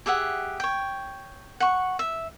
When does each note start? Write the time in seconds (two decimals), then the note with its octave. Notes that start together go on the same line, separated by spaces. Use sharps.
0.06 G4 G#4 E5 F#5
0.60 C#5 G5
1.60 F#5 C#6
1.99 E5